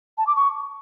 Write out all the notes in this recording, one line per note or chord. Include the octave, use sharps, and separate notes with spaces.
A5
D6
C#6